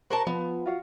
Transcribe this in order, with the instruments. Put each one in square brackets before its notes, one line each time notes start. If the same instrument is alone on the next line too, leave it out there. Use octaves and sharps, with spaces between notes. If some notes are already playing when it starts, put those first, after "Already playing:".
[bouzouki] F#4 A#4 A5 [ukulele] C5
[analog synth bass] F3 [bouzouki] B3
[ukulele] F4 F#4 F5